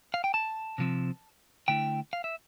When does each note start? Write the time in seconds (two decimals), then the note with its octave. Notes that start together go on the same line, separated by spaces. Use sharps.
0.14 F5
0.24 G5
0.34 A5
0.78 C3 F3 C4
1.68 D3 A3 E4 G5
2.13 F5
2.24 E5